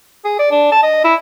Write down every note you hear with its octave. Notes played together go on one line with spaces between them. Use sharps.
G#4
D5
D4
A5
D#5
E4